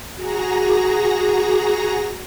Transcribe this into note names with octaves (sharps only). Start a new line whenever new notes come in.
F#4 G#4 A#5 A#6